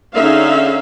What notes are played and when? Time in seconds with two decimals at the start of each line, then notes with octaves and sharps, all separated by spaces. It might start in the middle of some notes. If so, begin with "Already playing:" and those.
0.15 D3 C#4 D#4 G#4 E5 F5